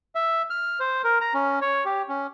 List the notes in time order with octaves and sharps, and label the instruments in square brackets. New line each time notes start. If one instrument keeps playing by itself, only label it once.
[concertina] E5
F6
C5
A#4
A#5
C#4
C#5
G4
C#4